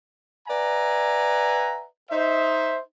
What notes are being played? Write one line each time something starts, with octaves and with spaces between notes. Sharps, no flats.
B4 D5 E5 F#5 G#5 A#5
D#4 C5 E5